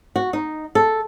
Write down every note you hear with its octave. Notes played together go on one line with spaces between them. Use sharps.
F#4
D#4
A4